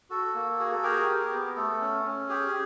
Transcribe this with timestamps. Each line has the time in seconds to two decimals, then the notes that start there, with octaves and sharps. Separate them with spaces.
0.10 F#4 A4
0.35 A#3
0.59 F#4 G#4
0.72 A4
0.83 G4 G#4 A#4
1.08 G4
1.31 B3
1.56 A3 A4
1.81 C#4
2.04 C#4
2.29 G4 G#4